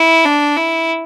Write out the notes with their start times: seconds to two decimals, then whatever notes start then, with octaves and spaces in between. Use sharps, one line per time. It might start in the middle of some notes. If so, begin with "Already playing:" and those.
Already playing: E4
0.25 D4
0.57 E4